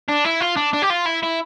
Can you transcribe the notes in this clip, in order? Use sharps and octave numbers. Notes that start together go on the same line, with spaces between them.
D4
E4
F4
D4
D4
G4
F4
E4
E4